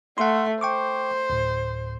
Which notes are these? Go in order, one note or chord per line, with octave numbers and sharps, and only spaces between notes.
A3 F#5 C6
C5 G5 C#6 D6
D2 A2